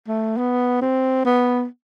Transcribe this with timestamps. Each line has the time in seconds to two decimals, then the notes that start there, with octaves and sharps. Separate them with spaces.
0.08 A3
0.37 B3
0.82 C4
1.25 B3